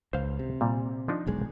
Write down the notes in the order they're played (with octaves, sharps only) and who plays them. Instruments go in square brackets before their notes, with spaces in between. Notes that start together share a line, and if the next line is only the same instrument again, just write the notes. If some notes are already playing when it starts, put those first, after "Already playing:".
[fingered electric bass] C#2 [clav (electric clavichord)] C5 F5
[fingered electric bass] C3
[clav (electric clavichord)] A#2 G3
F3 D4 D#4
[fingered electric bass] E1 B1 G#3